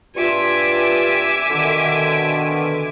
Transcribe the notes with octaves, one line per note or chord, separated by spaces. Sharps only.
G2 F4 E5 G#5 D6
B2 D3 D#3